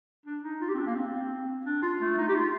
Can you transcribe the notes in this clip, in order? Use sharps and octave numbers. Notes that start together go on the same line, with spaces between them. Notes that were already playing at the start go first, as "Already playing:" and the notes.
D4
D#4
F4
G4
C4
D4
A#3
C4
D4
F4
A3
D#4
G4
F4